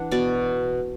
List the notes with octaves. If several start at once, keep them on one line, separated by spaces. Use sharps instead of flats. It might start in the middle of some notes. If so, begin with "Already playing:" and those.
Already playing: E3 D4 F#5
B2 D5